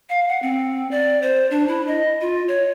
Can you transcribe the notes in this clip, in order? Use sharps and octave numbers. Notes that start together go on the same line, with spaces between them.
F5
F#5
C4
D5
C5
D4
E4
D#5
F4
C#5